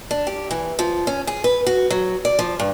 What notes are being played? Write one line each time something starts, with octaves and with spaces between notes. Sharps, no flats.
D4
G4
E3
F3
C#4
G#4
B4
F#4
F#3
D5
F3
G2